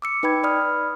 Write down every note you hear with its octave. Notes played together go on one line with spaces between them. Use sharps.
D6 E6 C#7
D#4 B4 G5 B5 G#6
D5 B5 D#6 F6